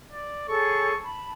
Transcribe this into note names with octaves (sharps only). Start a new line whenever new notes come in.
D5
G#4 A4 C#5 C#6
A5 B5